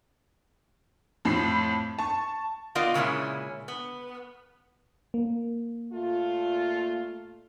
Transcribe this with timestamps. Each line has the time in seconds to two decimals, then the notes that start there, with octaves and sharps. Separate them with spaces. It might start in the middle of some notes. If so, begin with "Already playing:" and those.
1.25 F2 A2 B5 C7
1.99 A5 C#6
2.75 B3 F4 A#4 D5 D#5 F5
2.94 A#2 C#3 G#3 C#4 E4
3.68 B3
5.14 A#3
5.92 A#2 A3 F4